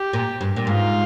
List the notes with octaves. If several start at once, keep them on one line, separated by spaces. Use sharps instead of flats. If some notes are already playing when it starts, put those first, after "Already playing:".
Already playing: G4
A#2
G2
A#2
G#2 F4